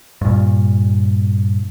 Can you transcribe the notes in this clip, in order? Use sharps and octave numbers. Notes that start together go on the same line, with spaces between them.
G2 A#2